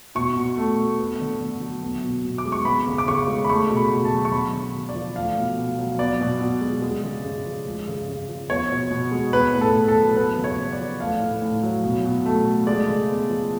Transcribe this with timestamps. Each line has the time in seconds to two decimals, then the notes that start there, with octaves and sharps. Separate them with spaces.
0.15 B2 C#6
0.37 B2
0.57 A3
0.77 A3
0.99 B3
1.20 D3
1.41 D3
1.61 F#3
1.83 B3
2.04 B2
2.25 B2
2.38 D6
2.45 G#3
2.52 C#6
2.65 B3 B5
2.87 C#3
2.98 D6
3.08 C#3 C#6
3.28 G#3
3.45 B5
3.50 A3 C#6
3.70 B2
3.77 B5
3.91 B2
4.05 A5
4.12 F#3
4.25 C#6
4.32 B3 B5
4.53 D3
4.75 D3
4.89 D5
4.96 F3
5.16 A3 F5
5.37 B2
5.58 B2
5.79 F#3
5.99 B3 D5
6.21 B2
6.41 B2
6.61 G#3
6.82 G#3
7.03 C#3
7.25 C#3
7.46 F3
7.67 G#3
7.87 C#3
8.08 C#3
8.28 F3
8.49 B3 C#5
8.71 B2
8.91 B2
9.12 G#3
9.33 B3 B4
9.54 A2
9.61 A4
9.75 A2
9.88 A4
9.96 F#3
10.17 B3 B4
10.38 C#3
10.44 C#5
10.58 C#3
10.73 D5
10.79 F3
11.00 A3 F5
11.20 A2
11.42 A2
11.63 F#3
11.84 B2
12.05 B2
12.26 A3
12.45 A3
12.67 G#3 D5
12.88 C#3
13.08 B3
13.30 F3